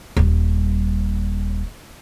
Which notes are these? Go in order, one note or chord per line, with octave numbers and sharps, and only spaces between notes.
D#1 G3